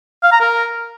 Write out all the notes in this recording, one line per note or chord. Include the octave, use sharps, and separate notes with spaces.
F5
A#5
A#4